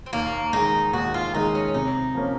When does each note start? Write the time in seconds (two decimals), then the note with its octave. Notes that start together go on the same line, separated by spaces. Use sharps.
0.06 C4
0.13 D#2 A#3
0.53 D#3 G#3 D#4
0.93 D#2 F#4
1.14 F4
1.33 D#3 G#3 D#4
1.55 C#4
1.74 C3 D#4
2.15 F3 A#3 C#4